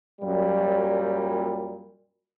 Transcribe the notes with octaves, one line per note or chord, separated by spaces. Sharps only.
F#2 A#2 G3